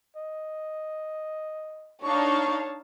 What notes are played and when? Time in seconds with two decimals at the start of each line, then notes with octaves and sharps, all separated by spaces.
0.17 D#5
2.03 D4 D#4 C#5 F5 A5 C#6